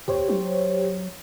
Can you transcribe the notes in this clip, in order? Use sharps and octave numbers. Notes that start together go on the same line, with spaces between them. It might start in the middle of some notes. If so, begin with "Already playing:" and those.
D#2 G4 C5 C#5
F#3